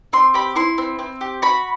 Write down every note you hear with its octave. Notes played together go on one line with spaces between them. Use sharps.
C4 C6
G4 B5
E4 C6
C4
C4
G4
F#4 B5